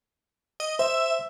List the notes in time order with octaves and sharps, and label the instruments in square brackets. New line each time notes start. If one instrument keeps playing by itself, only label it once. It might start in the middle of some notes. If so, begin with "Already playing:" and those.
[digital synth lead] D#5
[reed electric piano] C5 [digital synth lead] E5